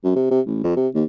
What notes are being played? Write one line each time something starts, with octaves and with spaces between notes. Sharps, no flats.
F#2
C3
C3
A1
F2
C3
D#2